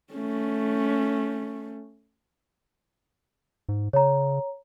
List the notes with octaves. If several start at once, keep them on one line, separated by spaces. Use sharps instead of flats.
A3 C#4
G#2
C#3 C#5 A#5